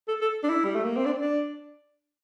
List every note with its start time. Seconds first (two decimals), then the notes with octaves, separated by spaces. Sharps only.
0.08 A4
0.21 A4
0.44 D4
0.50 E4
0.64 G3
0.75 A3
0.85 A#3
0.96 C4
1.06 D4
1.21 D4